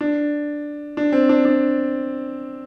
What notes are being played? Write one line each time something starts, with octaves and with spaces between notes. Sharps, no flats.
D4
D4
C4
D4
D4